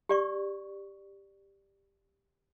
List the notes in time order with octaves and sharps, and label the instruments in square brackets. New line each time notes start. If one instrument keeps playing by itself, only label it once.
[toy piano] G4 D5 C#6